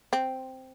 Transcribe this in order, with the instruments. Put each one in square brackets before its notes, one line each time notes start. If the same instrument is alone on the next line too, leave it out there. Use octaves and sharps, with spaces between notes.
[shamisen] C4